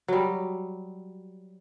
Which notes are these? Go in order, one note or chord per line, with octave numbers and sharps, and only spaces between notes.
F#3 G3